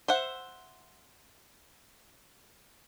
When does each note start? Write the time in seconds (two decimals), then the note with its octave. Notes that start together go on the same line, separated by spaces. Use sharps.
0.08 C5 E5 F#5